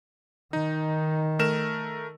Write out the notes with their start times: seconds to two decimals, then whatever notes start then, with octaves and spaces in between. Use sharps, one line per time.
0.53 D#3 D#4
1.39 A3 A#4 E7